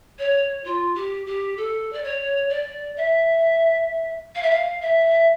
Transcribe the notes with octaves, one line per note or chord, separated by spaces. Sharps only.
C#5
F4
G4
G4
A4
D5
C#5
D5
E5
F5
E5
F5
E5